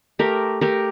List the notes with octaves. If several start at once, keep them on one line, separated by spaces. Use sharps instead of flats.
A3 G4 A#4
A3 G4 A#4